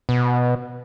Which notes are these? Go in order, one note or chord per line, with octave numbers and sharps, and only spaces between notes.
B2